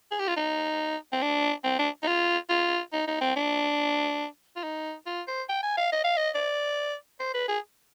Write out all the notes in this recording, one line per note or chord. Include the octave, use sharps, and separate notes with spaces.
G#4
G4
F4
D#4
C4
D4
C4
D4
D#4
F4
F4
D#4
D#4
C4
D4
F4
D#4
F4
C5
G5
G#5
F5
D#5
F5
D#5
D5
C5
B4
G#4